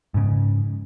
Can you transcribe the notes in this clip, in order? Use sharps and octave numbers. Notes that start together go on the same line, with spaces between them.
G#2 C#3